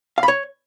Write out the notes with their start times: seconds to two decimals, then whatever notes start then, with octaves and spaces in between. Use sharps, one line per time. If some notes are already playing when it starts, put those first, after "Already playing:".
0.18 F5
0.23 B5
0.28 C#5